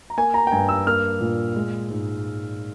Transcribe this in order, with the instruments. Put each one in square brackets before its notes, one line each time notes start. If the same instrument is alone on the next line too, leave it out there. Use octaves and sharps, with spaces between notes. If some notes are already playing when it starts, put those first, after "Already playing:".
[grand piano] A#5
A#3 G#5
A#5
G5
G2 G#5
E6
A#3 F6
A#2
G#3
G#2